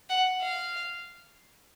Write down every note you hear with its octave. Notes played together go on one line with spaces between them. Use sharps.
F#5
F5